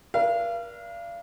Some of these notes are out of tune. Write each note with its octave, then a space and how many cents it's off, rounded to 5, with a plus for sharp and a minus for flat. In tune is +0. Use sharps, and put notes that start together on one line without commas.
A#4 +40 D5 +0 F5 -35